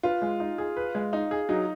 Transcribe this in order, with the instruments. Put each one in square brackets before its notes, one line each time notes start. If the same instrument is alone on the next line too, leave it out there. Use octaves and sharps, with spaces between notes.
[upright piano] F4 [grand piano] B4
[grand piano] G#3
D#4
G#4
B4
G#3
D#4
G#4
[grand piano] F#3 [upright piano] D#4